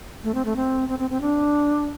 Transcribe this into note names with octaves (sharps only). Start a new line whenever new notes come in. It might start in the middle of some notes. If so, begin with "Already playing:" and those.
A3
C4
A3
C4
C4
C4
C4
D4